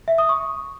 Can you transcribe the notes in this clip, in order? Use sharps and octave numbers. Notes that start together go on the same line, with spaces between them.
E5
D#6
C#6